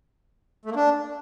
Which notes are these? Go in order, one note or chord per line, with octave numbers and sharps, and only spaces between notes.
A3
A#3
D4